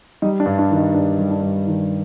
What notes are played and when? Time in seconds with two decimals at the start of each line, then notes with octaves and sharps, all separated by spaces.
0.22 G3 D#4
0.40 D4
0.46 G2
0.59 D4
0.71 D#3
0.77 D#4
0.94 G2 D4
1.19 G3
1.31 D4
1.42 G2
1.67 D#3